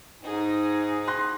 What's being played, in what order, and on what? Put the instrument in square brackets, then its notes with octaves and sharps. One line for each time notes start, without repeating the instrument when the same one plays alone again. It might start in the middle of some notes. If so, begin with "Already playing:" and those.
[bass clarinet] G#2 [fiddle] D#4 G#4
[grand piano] C6 F#6 A#6